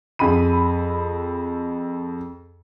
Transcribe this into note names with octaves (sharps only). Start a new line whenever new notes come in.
F2 G#4 B5 D#7